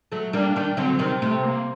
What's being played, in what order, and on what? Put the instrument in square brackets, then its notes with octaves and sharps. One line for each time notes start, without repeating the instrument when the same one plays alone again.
[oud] F#3 A3
[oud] G3 A#3 [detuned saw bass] D4
[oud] D#3 G3
[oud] D3 F#3 [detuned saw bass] C4
[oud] C3 D#3
[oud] C3 [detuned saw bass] A3
[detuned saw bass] A#3